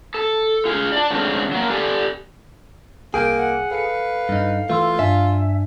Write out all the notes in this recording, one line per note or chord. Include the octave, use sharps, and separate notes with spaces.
A4
F4 G#4
D5 A5
D3 G#3 A3 C4 C#4 F4
F#3 A#3
G4 A4 D5 G#5
C2 A#3 G#4 G5
F#5
A4 B4 F5 C#7
G2 D#4
E3 A3 F4 C6 E6
G2 D4 E5 G#5